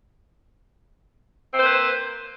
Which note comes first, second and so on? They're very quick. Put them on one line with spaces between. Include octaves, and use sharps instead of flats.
C4 C5 A#3 B4